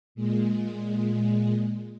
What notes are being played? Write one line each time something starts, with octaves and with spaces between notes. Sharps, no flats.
A#2 G#3